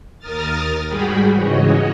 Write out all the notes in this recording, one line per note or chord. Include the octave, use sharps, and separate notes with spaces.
D#2 A#4 D#6 F6 A6
G#2 G3 F#4 G#4 G5 B5
G#2 C#3 E3 F#4 C#5 D#5